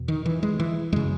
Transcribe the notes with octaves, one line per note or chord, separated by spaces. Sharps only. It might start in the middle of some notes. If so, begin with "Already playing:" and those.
Already playing: E2 B2
D#3
E3
G#3
E3
F#2 C#3 G#3